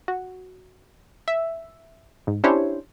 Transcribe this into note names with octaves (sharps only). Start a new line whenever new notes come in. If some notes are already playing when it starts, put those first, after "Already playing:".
F#4
E5
G#2
C#4 D4 E4 G4 C5 C#5